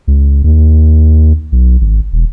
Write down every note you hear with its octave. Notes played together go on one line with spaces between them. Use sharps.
C#2
D#2
B1
G#1
E1